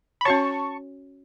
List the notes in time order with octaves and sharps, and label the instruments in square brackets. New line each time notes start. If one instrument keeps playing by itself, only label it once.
[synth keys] B5
[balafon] C#4 F#4 C#5 [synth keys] A5 C#6